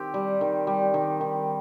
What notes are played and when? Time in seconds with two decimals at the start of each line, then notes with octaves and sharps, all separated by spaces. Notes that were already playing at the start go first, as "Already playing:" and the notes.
Already playing: D#3 C4 G4
0.14 G3
0.41 D#3
0.67 G3
0.94 D#3
1.21 D#3